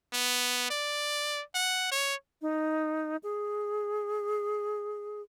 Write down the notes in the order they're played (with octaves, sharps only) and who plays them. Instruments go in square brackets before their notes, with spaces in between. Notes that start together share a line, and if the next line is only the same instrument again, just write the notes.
[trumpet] B3
D5
F#5
C#5
[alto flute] D#4
G#4